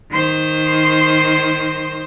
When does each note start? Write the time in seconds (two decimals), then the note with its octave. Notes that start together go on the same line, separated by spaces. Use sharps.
0.11 D#3 C5